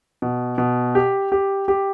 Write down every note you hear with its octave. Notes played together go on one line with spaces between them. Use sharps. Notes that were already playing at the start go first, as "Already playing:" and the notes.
B2
B2
G4
G4
G4